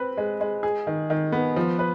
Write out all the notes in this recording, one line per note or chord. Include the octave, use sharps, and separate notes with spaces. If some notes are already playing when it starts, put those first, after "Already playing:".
Already playing: C4 B4
G#3
G#3
G#4
D#3
D#3
B3
F3
B4